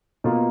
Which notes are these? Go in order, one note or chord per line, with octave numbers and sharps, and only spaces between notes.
B2 A#3 F4